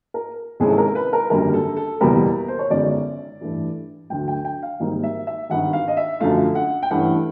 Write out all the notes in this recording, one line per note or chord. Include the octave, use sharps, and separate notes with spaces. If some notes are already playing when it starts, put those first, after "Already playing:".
A#4
C2 C3 D#3 G#3 C#4 G#4
A4
A#4
B4
A#4
G#1 F#2 D3 G3 A#3 A#4
A4
A4
F#1 E2 B2 G3 B3 A#4
C5
C#5
G1 F#2 D#3 G#3 C#4 D5
A1 G2 E3 A3
D2 D3 F#3 G5
G5
G5
F5
G#1 G#2 D#3 G3 A#3
E5
E5
G#1 G2 D#3 F#5
F5
D#5
E5
F#2 D3 F3 A3 F5
F#5
G5
G2 E3 A3 C#4 F#5